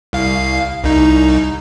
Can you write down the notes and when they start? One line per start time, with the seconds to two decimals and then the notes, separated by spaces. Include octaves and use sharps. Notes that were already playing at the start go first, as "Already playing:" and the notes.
0.13 C2 F5
0.84 C2 D#4